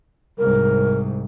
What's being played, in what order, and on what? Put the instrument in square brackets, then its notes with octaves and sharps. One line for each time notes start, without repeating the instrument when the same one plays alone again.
[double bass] C2 G#2 [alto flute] A#4